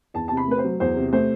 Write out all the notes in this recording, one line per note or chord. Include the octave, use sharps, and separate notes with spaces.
E2 A5
C3 A5
B5
A3 B4
C5
F#3
E2 C5
C3
A3 C5